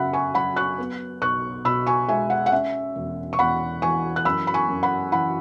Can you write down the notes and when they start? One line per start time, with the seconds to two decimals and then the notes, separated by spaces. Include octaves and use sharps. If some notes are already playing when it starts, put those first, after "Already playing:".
Already playing: F#2 C#3 B3 E5 F#5 B5
0.13 G#5 C#6
0.34 F#3 F#5 B5
0.56 C#6 F#6
0.78 B3
1.21 B1 C#6 F#6
1.65 B2 B5 E6
1.87 G#5 C#6
2.08 G#3 E5 G#5
2.30 F#5
2.46 F#5
2.52 C#4 E5
2.96 E1
3.33 C#6
3.39 E2 F#5 B5
3.82 E3 G#5 C#6
4.16 F#6
4.25 F#2 B5 E6
4.47 B5
4.54 G#5 C#6
4.68 F#2
4.83 F#5 B5
5.12 E3 F#5 B5